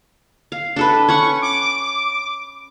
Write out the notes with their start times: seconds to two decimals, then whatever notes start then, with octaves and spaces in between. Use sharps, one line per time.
0.52 F5
0.76 D4 A4 B4
1.08 C#4 B4 F#5 C#6
1.42 D6